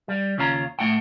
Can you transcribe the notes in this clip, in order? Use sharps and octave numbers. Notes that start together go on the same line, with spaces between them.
G3
D#2 C#3 C#4 F4 F#4 A#5
A2 A3 D4 F#5 G5